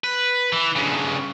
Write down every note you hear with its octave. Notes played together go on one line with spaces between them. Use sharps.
B4
E3
G2 C#3